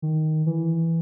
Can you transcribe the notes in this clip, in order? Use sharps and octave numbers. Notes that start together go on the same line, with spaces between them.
D#3
E3